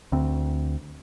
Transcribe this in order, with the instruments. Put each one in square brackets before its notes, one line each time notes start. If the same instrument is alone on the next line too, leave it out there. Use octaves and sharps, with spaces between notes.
[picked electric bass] D2 C4